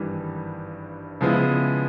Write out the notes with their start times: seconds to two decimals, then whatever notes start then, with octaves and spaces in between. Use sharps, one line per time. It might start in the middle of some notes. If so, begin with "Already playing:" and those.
Already playing: G#1 G2 E3 G3
1.21 C#3 F3 G#3 B3 E4